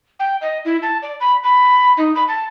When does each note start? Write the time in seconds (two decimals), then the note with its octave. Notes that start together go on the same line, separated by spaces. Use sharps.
0.20 G5
0.41 D#5
0.65 E4
0.83 A5
1.02 D5
1.20 B5
1.44 B5
1.98 D#4
2.15 B5
2.28 A5